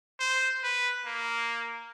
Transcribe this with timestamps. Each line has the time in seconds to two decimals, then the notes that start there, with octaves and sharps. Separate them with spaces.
0.20 C5
0.63 B4
1.06 A#3